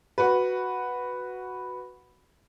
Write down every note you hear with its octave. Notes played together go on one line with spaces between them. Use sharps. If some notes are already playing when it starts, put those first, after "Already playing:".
F#4 B4